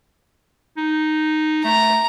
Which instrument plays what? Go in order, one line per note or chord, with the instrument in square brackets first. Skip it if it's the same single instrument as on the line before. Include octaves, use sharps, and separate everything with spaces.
[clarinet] D#4
[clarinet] A3 [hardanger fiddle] A#5